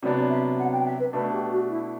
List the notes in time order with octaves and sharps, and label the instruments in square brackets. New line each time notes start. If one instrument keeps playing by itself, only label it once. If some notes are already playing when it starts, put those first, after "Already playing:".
[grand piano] C3 F#3 B3 D4 [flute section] D5
[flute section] E5
F#5
G5
E5
B4
[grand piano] B2 A3 D4 [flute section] B4
[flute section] G4
F#4
E4